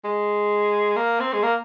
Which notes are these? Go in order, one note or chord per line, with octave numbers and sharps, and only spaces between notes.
G#3
A#3
C4
G#3
A#3